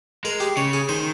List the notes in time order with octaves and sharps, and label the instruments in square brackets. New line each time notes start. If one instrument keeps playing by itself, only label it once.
[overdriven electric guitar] G#3 [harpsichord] A#4
[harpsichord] G4
[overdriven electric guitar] C#3 [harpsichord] C#5
[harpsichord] G#4
[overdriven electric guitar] D#3 [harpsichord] C5